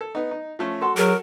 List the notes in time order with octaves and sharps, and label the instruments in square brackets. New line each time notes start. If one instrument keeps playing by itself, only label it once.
[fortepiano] A4
B3 D#4
D#4
F3 A3 C#4
[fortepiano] F#4 A4 [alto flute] C6
[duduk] F#3 [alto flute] G#4 [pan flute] A#4